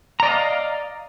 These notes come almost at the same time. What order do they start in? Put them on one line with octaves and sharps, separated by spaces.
A#5 D5 D#5 F5